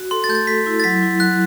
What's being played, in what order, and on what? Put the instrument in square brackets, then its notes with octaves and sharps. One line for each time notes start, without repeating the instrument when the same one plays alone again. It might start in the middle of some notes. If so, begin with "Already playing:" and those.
Already playing: [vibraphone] F#4
[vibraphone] A4 [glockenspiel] C6
[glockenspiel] A6
[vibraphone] A3 [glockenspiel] G6
[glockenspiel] A6
[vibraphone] A4 [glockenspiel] B6
[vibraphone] E4
[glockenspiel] A6
[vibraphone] F#3 [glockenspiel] B6
[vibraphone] E4
[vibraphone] F#3 [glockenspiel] F#6